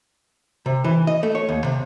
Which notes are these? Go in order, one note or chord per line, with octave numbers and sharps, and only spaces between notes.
C3
E3
D#5
A3
C#5
D#2
C3